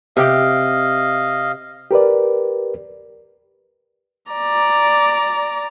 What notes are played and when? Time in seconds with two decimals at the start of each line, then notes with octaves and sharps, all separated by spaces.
0.17 C3 G4 D#5 F5 G5
1.91 G4 A#4 B4 D5
4.32 D5 A#5